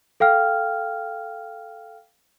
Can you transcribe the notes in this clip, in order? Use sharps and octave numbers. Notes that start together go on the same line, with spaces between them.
A4 F5 G5 F6